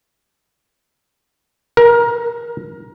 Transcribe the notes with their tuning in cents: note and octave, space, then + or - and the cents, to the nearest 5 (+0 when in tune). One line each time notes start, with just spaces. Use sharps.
A#4 +20